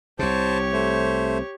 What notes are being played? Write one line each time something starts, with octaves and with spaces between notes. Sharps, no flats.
C2 C3 G4 C5 C#5 A5
A3 C5